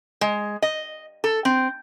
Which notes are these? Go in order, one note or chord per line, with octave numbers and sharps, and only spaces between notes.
G#3
D#5
A4
C4